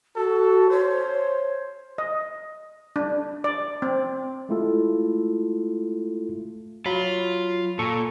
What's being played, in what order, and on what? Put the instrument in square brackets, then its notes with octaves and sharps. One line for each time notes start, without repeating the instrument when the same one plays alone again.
[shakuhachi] F#4 [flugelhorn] A4
[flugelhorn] C5 [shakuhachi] C#5
[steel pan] D#5
D4
D5
C4
[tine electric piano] G#3 A3 E4 F4 A4
[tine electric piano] F#3 B5 [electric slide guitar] F4
[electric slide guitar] A#2 [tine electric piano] A4 C#6